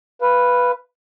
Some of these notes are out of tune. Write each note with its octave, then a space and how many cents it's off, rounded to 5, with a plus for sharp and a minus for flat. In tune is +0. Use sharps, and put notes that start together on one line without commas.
B4 +0 F5 -15